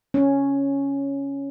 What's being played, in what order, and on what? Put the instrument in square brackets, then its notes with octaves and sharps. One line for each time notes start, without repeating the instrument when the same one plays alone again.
[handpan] C#4